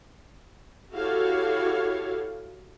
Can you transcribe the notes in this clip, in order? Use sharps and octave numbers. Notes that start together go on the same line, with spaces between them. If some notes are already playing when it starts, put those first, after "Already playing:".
E4 F#4 G4 A4 C#5 F5